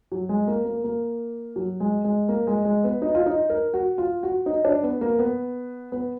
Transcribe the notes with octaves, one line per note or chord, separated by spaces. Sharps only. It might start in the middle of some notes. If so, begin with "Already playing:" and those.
F#3
G#3
A#3
A#3
A#3
F#3
G#3
G#3
A#3
G#3
G#3
B3
D#4
F4
D#4
A#4
F#4
F4
F#4
D#4
D4
B3
A#3
B3
B3